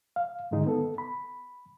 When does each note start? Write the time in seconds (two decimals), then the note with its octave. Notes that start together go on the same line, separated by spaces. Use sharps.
0.16 F5
0.51 G#2 D3 D#3 G#3 D#4
0.66 B3 A4
0.98 B5